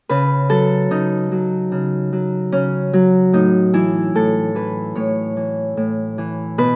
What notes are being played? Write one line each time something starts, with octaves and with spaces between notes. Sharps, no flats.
C#3 B4
F#3 A4
C#3 D#4
F#3
C#3
F#3
C#3 C#4
F#3
A2 D#4
E3 E4
A2 A4
E3 B4
A2 C#5
E3
A2
E3
B2 B4